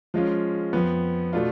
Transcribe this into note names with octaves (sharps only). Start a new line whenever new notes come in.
F3 G#3 C#4 F4
F2 F3 B3
B2 A3 D4 F4